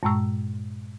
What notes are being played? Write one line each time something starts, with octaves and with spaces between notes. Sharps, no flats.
G2 A#2 G#3 A#5 C#6 E6